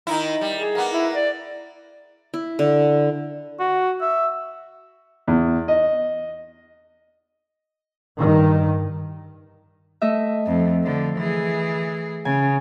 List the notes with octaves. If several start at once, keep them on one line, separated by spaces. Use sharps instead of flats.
D#3 D#4 E4
G3
G#4
A#3 B3
E4
D5
E4
D3
F#4
E5
E2
D#5
G2 D#3
A3 D#5 E5
F2
D3 F3
E3 G#4
C#3 G#5